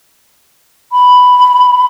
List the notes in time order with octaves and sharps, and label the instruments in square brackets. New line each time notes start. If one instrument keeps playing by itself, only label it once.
[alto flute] B5